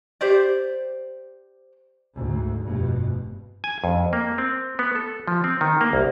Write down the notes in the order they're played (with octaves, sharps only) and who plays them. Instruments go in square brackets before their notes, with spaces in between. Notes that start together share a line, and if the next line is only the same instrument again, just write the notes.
[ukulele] G4 C5 D5
[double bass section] D2 G#2
F1 G2 B2
[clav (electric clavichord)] G#5
F2
A#3
C4
B3
A4
F3
C4
D#3
A#3
C2